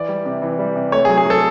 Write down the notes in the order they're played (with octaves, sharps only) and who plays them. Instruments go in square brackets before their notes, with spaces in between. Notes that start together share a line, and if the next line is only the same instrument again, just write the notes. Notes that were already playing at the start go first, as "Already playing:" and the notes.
Already playing: [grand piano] E3 D5
G3
C3
E3
G3
C3
A3 C#5
G#4
F#3
G#4
F#3 A4